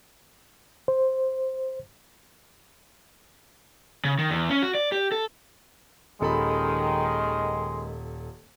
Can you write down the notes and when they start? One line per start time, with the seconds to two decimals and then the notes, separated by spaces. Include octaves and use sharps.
0.88 C5
4.05 C#3
4.19 D#3
4.30 E2
4.50 C#4
4.62 F#4
4.75 D5
4.92 G4
5.12 A4
6.21 D#1 D#3 G#3 A4 B5